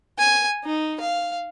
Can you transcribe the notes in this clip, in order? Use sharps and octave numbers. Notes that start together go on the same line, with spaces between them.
G#5
D#4
F5